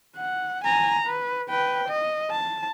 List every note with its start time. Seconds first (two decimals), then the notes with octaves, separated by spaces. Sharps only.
0.17 F#5
0.64 G#5 A#5
1.07 B4
1.50 B4 G5
1.88 D#5
2.31 A5